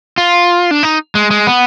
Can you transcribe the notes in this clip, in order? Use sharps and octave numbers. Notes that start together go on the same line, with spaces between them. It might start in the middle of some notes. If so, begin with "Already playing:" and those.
F4
D4
D#4
G#3
G#3
B3